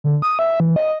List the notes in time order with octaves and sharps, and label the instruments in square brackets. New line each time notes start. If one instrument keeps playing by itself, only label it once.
[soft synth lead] D3
D#6
E5
E3
D#5